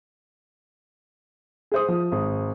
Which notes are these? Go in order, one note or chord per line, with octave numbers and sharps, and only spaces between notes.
G#4 C5 D#6
F3
G#1